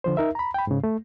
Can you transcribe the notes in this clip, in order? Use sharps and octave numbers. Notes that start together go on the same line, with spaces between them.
D3 F3 C5
D#4 A#4 E5
A#5 B5
G5 B5
G#2 C#3
A3